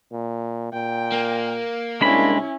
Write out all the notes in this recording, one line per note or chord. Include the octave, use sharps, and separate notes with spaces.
A#2
A#2 G5
A#3
C2 G#3 C#4 D4 E4 B5